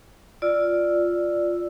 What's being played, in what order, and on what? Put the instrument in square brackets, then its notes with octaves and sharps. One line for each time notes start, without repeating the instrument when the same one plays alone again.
[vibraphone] F4 D5 E6